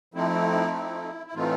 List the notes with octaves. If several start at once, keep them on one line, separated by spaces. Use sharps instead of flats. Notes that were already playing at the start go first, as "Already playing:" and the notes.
F3 A3 C4 D#4 E4
E4
E4
A2 E3 A3 C4 D#4 F4